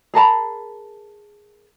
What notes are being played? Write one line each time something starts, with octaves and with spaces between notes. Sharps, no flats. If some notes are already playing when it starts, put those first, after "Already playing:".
G#4 A#4 A5 B5